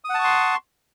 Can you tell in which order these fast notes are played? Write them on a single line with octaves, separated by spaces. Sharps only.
D#6 F#5 A5 C#6 C6